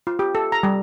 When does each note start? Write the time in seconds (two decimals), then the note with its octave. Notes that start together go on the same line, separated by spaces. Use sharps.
0.07 F4
0.19 G4
0.35 A4
0.52 A#5
0.63 G3